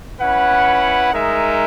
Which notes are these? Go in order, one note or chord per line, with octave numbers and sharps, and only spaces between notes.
C#4 E4 B4 F#5
G#3 D#4 A#4 E5